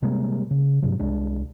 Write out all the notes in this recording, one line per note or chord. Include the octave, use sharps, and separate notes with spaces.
C3 G3 G#3 A#3
C#3
G2 C3 F#3
C2 G#3 D4